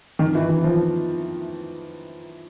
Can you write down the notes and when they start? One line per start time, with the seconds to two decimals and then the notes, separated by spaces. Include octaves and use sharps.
0.19 D#3
0.35 E3
0.49 E3
0.64 F3